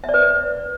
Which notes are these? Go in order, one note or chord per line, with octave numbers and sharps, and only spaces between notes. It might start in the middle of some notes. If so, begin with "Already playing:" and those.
E5
D5
B4